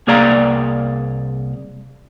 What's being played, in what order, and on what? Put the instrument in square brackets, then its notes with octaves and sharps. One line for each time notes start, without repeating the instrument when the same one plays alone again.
[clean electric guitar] C2 A#3 G#4 D5 F5 A#5